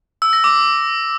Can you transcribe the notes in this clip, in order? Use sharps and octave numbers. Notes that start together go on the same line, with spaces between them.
E6
A#6
D6